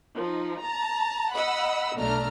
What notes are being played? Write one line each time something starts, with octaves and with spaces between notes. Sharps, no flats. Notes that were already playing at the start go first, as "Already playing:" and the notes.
F3 D#4
A5 A#5
D#5 F#5 B5 E6
B1 B2 A3 D4 A#5 F6